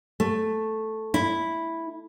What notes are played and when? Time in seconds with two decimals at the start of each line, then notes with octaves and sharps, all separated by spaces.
0.20 A3
1.14 E4